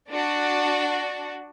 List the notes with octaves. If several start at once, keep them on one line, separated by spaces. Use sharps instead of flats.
D4 F#4